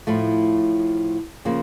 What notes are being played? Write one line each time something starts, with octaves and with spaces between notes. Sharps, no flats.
A2 F3 A3
C#3 F3 A#3